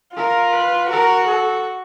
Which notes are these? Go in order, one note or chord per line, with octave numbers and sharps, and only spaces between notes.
F4 A#4
B4
F#4 A#4
A4